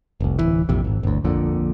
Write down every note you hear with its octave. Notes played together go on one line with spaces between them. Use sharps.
F1 C2
D1 B1 E3
A#1 F2 C3
G#1
G1 D2
A#1 F2 A#2 D3